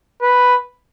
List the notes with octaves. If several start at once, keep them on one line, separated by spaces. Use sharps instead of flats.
B4